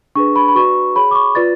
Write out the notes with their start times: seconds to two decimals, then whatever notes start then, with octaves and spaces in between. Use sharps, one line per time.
0.15 D4 G#4 B4 C#6
0.36 B5
0.48 B5
0.55 F#4 B4 D5 C#6
0.96 G#4 C#5 B5
1.11 D6
1.15 C#6
1.35 F4 B4 D5 A6